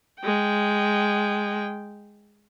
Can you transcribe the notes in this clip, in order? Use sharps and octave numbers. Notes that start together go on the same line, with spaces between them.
G#3 G5